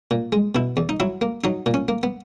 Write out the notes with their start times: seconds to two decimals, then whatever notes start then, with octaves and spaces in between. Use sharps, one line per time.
0.11 A#2
0.32 G#3
0.55 B2 E4
0.77 E2
0.89 D#4
1.00 F#3 E4
1.21 A#3
1.44 F#3 D#4
1.66 A#2
1.74 C#4
1.88 A#3
2.03 B3